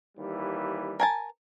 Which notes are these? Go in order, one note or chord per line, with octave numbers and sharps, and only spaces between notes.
D#2 E3 G3
A#4 G#5 A5